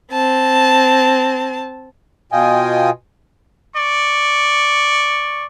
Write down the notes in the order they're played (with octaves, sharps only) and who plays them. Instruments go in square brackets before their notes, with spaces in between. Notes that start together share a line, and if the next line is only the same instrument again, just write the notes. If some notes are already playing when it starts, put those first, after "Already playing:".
[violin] C4 A5
[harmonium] B2 F4 D#5 G5 G#5
[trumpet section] D5 C#6